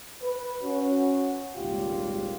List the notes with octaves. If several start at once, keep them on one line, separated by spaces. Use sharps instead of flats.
B4
C#4 F#4
G#1 C#2 A#2 G3 F4 G4